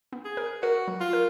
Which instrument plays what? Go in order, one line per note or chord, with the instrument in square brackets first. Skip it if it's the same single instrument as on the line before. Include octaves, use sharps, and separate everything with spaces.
[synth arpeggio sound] B3
[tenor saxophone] G#4
[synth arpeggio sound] A#4
[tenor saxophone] F#4 [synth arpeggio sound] A#4
[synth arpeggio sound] F#3
[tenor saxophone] F4
[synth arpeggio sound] A#4